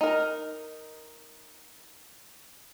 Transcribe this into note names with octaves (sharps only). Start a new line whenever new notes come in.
D#4 A#4